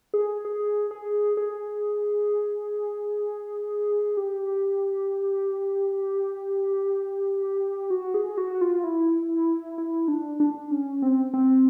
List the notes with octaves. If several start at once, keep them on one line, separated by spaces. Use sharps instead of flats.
G#4
G#4
G#4
G#4
G4
F#4
G#4
F#4
F4
E4
E4
D4
D4
C#4
C4
C4